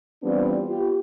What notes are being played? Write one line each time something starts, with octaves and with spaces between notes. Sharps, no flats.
E3 G3 B3 C4 D4 F4
B3 F4 G4